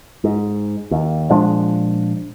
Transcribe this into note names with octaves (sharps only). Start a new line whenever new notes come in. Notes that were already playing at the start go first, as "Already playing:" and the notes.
G#2
D#2
A#2 F3 G#3 D4